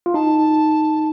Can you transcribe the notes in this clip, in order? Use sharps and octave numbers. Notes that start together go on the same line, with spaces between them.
F4
D#4 A5